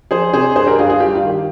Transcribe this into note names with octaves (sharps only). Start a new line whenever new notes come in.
F3 G#4 C5
C3 G#4 C5
G2 G#4 C5
G4 A#4
G2 F4 G#4
F4 G#4
G3 G4
F4
D#3
G4